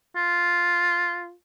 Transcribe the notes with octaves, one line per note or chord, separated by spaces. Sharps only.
F4